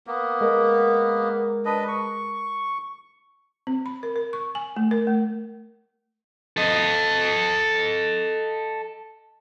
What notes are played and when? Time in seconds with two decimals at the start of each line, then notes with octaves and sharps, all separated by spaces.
0.07 A#3 B3
0.41 G#3 A#4
1.65 D4 B4 D#5
1.88 C#6
3.67 C4
3.86 B5
4.03 A#4
4.16 A#4
4.33 C#6
4.55 G#5
4.77 A3
4.91 A#4
5.07 A3
6.57 A4 D#5